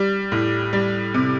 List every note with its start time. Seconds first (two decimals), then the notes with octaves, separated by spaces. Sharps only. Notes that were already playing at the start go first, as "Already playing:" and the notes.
Already playing: G3
0.32 A2
0.73 G3
1.14 C3